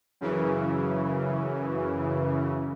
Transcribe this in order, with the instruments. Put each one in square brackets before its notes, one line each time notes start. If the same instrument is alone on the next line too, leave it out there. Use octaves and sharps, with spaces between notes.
[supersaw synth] F#2 C#3 E3